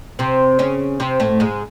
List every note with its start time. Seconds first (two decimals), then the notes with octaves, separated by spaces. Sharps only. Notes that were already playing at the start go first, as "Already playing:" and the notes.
0.19 C3 C4
0.59 C#3 C#4
1.00 C3 C4
1.20 A2 A3
1.40 G#2 G#3